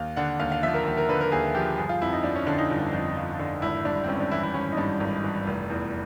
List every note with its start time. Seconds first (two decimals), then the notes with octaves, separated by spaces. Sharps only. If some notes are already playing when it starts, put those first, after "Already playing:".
Already playing: D#2 F5
0.16 D3 F#5
0.40 D#2 F5
0.52 F5
0.63 F3 E5
0.74 A#4
0.85 D#2
0.97 A#4
1.09 D3 B4
1.21 A#4
1.31 D#2 G#4
1.55 F3 G4
1.78 G1 G#4
1.89 F4
2.01 F2 E4
2.13 D#4
2.24 F3 D4
2.35 C#4
2.46 D3 D4
2.58 D#4
2.70 G1
2.93 F2
3.16 F3
3.39 D3
3.62 G#1 E4
3.85 G2 D4
4.04 C4
4.08 G#1 C#4
4.20 D4
4.31 E3 E4
4.43 E4
4.54 G#1 C#4
4.72 D#4
4.77 G2 D4
5.00 G#1
5.24 E3
5.47 F1
5.70 E2